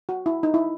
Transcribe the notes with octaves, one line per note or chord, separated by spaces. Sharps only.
F#4
E4
D#4
E4